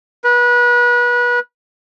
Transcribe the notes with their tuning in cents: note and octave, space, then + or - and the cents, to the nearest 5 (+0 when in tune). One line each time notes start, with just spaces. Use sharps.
B4 -30